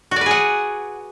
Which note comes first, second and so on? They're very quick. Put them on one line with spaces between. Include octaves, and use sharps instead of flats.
F#4 D5 B4 G#4 F#5